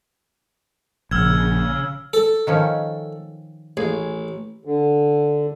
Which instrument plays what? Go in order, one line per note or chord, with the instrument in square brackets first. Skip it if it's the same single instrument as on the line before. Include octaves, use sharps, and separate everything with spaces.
[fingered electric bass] A#1 [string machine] C#3 [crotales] E6 F6 G#6
[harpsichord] A4
[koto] D#3 F3 C#4
[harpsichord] A1 [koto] G#4
[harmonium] D3